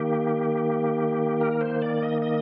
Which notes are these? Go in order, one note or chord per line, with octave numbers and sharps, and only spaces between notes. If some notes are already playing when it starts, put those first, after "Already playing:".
Already playing: D#3 A#3 G4
A#4
C5
D5
D#5
D#5